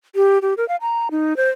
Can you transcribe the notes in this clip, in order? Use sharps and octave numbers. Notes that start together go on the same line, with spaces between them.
G4
G4
A#4
F5
A#5
D#4
C5